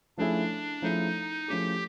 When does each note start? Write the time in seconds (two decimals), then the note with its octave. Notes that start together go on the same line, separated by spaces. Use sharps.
0.17 F3 A3 C#4 D4 E4 G#4
0.82 F3 A3 C#4 D#4 E4 G#4
1.48 F3 A3 C#4 E4 G4 G#4